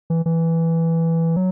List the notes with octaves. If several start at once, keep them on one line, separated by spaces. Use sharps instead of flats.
E3
E3
F#3